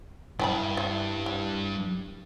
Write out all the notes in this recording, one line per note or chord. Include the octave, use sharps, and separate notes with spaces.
G2 E4 G#5 A5 B5
E4
E4